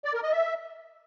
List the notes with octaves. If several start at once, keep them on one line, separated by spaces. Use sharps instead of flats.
D5
A#4
D#5
E5